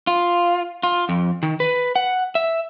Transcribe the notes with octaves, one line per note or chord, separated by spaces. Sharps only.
F4
F4
F2
D#3
B4
F#5
E5